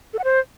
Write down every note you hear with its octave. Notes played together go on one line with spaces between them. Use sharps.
A4
F#5
C5